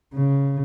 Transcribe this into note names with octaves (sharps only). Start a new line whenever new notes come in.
C#3